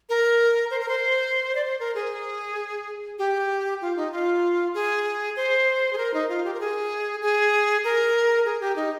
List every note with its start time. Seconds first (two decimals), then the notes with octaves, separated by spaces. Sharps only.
0.09 A#4
0.71 C5
0.80 A#4
0.89 C5
1.55 D5
1.64 C5
1.80 A#4
1.95 G#4
3.19 G4
3.81 F4
3.97 D#4
4.12 F4
4.74 G#4
5.36 C5
5.93 G#4
5.98 A#4
6.14 D#4
6.29 F4
6.44 G4
6.54 A#4
6.60 G#4
7.22 G#4
7.84 A#4
8.45 G#4
8.61 G4
8.76 D#4